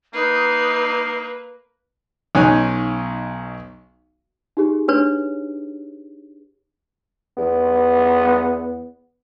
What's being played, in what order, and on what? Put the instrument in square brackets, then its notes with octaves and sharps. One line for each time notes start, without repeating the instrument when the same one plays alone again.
[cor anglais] A#3 [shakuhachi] D#4 [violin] B4 [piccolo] C7
[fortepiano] B1 C#4 D#4 G#5 F#6
[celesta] D#4 G4 G#4
[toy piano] D4 B4 C#5
[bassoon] E2 [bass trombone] B3